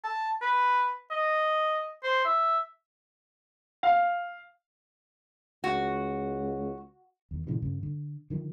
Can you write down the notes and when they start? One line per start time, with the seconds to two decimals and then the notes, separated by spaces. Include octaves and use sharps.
0.04 A5
0.42 B4
1.11 D#5
2.03 C5
2.25 E5
3.83 F5
5.64 C#2 F#4
7.31 E2 D#3
7.47 G2 A#2 C#3 E3
7.62 G2 C#3
7.83 D3
8.30 D3 D#3 F3